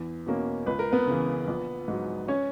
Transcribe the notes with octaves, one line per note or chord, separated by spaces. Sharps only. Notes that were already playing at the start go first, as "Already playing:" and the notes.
Already playing: E2
B2 A#3 C#4
C#2 B4
A#4
B3 B4
C#3 E3
A#1
G#2 F#3
C#4 C#5